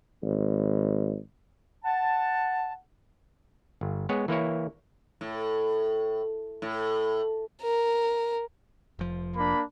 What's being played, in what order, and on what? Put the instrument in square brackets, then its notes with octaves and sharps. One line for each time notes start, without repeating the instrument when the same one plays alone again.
[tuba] G#1
[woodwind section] F#5 A5
[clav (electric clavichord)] G1
G#3 B3 C#5
E3 A#3 E4 C#5
[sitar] A2
A2
[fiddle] A#4
[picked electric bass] F1 F3
[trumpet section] A#3 D4 B5